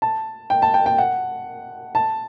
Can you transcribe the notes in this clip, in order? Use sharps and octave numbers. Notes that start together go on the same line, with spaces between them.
A5
G5
A5
G5
G5
F#5
A5